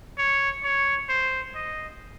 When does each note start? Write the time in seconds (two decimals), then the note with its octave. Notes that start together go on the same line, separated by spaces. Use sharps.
0.18 C#5
0.64 C#5
1.09 C5
1.55 D#5